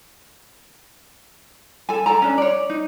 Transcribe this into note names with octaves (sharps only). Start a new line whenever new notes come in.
A4 G#5
A4 D5 G#5 A#5
C#4 D4
C#5 D5
D#4